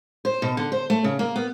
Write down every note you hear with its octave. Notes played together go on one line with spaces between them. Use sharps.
C5
B2
D3
C5
A3
C#3
A#3
B3